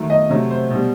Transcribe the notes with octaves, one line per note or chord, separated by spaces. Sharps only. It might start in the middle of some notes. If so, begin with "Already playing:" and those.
Already playing: D#3 F#3 A3
D#5
C3 F#3 A3
C5
B2 G3